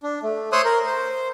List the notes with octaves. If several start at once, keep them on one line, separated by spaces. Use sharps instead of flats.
D4
A3
C5 C#5 C6 D#6 E6 F#6
A#4
C5